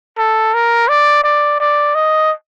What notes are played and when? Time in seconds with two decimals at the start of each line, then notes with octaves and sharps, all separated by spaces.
0.17 A4
0.54 A#4
0.89 D5
1.24 D5
1.60 D5
1.95 D#5